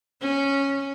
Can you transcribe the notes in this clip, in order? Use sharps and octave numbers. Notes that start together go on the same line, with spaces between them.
C#4